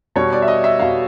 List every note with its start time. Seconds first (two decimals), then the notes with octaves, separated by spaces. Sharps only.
0.16 B2 G3 C#5
0.33 D5
0.42 E5
0.48 D#5
0.64 E5
0.79 B2 G3 F5